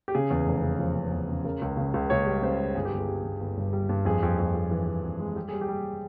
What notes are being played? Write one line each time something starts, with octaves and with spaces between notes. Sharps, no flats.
G4
C#3 G#4
E2
F1
C#3
F3
C#3
E2
C#3
C#3 A#4
C#2
C#3
C#2
C#2 C#5
G3
C#3 C5
G3
G1 G#4
G4
G1 G#4
G3
G1
G1
G2
G3
G2
F2 G#4
F2
F2
F2
E3
F2
F2
G#3
G3 G4
G3 G#4
G4
G3